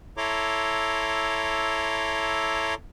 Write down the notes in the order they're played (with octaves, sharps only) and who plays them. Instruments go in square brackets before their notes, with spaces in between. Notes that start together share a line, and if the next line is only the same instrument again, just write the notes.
[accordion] E4 A4 C#5 A#5 C6 D6